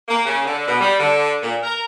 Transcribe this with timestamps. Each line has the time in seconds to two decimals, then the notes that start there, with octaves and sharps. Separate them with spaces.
0.09 A#3
0.26 C#3
0.45 D3
0.68 B2
0.80 G3
0.99 D3
1.41 A#2
1.63 A#4